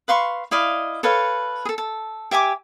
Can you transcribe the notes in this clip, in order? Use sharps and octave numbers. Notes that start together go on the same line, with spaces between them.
B4 F5 C6 C#6
E4 D5 D#5 F5
A4 B4 C#5 F5
G#4 A4
A4
G4 E5 G#5 D6